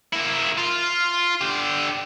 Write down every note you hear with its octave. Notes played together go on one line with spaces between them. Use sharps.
A#3 E4
F4
D3 G4